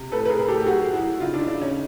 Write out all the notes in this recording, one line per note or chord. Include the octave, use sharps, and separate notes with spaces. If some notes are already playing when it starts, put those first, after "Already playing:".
Already playing: C3
A2 A4 B4
B4
G#4 A#4
A2
G4 A4
G4
F#3 F#4 G#4
F#3 E4 F#4
C#3 D#4 F4
D4 E4
C#3 D4
C#4 D#4